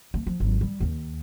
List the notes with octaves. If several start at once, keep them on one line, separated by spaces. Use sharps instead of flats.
A3
F3
G#1 F#3
G3
D#2 D#3